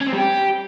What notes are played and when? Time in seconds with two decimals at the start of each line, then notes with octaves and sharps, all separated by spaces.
0.01 C#4
0.07 C4
0.12 G3
0.18 G4